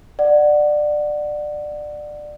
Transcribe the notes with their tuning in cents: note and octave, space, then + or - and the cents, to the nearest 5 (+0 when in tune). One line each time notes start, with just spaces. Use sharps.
D5 +20 F#5 +0